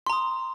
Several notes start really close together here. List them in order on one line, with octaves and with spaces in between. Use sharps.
C6 A#5 D#6